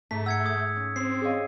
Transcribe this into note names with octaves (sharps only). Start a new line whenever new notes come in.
G#2 A3 A5 A#5 A#6 B6
F#5 E6 G#6 C#7
D#6 G#6
C#4
C4 C7
G4 G#4 C#5 D#5 F5